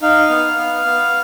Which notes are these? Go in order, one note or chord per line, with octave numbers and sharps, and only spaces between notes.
D#4 F5
B3
B3
B3